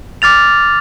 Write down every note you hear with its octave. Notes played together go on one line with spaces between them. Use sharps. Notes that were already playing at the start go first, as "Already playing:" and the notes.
D6 F6 A6 F7